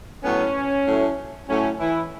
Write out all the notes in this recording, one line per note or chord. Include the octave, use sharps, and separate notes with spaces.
A2 F#3 B3 C#4
A2 F#3 A3
A2 F#3 A3 C#4
E3 E4